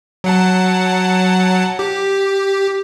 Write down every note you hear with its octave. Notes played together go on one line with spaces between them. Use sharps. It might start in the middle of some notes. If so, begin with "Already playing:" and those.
F#3 F#5 A5
G4